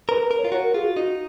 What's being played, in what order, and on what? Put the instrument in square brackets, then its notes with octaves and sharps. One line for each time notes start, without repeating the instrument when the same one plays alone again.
[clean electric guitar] A#4 [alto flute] B4
[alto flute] B4
[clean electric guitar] A#4
[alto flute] C#5
[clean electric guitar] F4
[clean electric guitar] F#4 [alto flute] C#5
[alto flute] A#4
[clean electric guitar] F4 [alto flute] G#4
[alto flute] F#4
[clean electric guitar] D#4